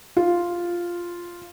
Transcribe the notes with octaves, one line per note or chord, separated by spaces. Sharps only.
F4